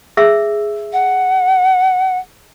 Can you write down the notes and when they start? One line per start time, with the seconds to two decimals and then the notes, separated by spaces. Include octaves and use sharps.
0.17 G#4 E5 E6
0.93 F#5